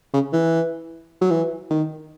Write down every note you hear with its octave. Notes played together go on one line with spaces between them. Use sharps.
C#3
E3
F#3
E3
D#3